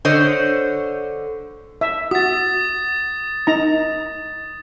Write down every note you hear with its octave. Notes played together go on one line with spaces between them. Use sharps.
D3 C5 C#5 D#5
E5
F#4 D#6 A6
D#4 A#5